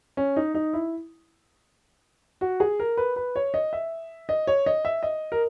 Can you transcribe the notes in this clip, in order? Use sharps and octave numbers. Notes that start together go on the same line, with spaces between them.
C#4
D#4
D#4
E4
F#4
G#4
A#4
B4
B4
C#5
D#5
E5
D#5
C#5
D#5
E5
D#5
A#4